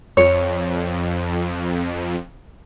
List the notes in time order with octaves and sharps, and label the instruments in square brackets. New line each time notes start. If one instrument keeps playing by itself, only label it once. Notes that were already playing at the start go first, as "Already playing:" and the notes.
[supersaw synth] F2 [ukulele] C#5